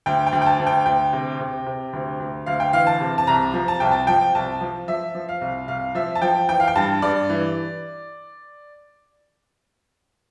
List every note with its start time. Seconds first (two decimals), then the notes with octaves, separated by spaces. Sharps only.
0.06 D2 G5
0.27 G5
0.32 D2
0.42 G5
0.46 A5
0.60 D2
0.67 G5
0.86 D2 G5
1.13 C3
1.40 C3
1.66 C3
1.93 D2
2.20 D2
2.46 D2 F5
2.60 G5
2.73 E3 F5
2.87 A5
3.01 C3
3.18 A5
3.27 C2 A#5
3.54 F3
3.68 A5
3.80 C2 G5
3.92 A5
4.07 F3 G5
4.35 C2 A5
4.61 F3
4.88 F3 E5
5.15 F3
5.29 F5
5.41 C2
5.68 C2 F5
5.95 F3 E5
6.15 A5
6.22 F3 G5
6.49 E3 G5
6.60 F5
6.68 G5
6.76 G2 A5
7.02 G2 D5
7.30 E3